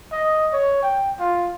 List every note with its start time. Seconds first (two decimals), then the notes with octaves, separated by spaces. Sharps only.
0.12 D#5
0.53 C#5
0.83 G5
1.19 F4